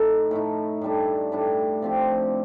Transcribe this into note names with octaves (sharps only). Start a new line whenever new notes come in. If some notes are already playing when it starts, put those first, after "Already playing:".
Already playing: A2 A3 D#4
A2 A3 D#4
A2 G3 D4
A2 G3 D4
F3 C4 G4